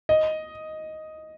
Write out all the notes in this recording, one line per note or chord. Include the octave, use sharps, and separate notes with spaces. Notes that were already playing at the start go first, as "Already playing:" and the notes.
D#5